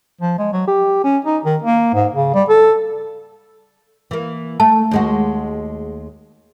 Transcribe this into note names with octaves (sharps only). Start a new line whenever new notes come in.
F3
G#3
F#3
G4
C#4
D#4
D#3
A#3
G#2
C#3
G3
A4
E3 A#3
A3 A5
D#2 G#3 F#4